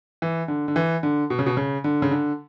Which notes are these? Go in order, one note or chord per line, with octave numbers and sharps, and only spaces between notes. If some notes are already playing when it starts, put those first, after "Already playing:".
E3
D3
D3
E3
D3
B2
C#3
B2
C#3
D3
C#3
D3